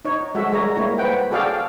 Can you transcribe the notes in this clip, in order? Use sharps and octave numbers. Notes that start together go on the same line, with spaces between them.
D#4 C#5
G#3 F#4 A4 E5
G3 G#3 A#4 C#5 D#5 A#5
A#3 E4 C#5
B4 C5 F#5 G5
F#4 G#4 A4 D5 F5 G5